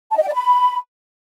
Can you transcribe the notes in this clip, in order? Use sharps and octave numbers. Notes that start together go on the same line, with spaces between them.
A5
D#5
G5
D5
B5